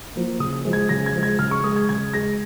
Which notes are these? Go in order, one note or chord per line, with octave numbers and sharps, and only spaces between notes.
F3 A#3
C#3 D#6
F3 G#3
G#6
C#3 A#6
G#6
F3 G#3
G#6
C#3 F6
C#6
G#3 D#6
G#6
C#3 G#6
G#3 A#6